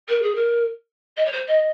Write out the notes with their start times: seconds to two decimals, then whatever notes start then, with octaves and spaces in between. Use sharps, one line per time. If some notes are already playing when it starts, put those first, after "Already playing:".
0.08 A#4
0.22 G#4
0.35 A#4
1.17 D#5
1.25 C#5
1.32 C5
1.48 D#5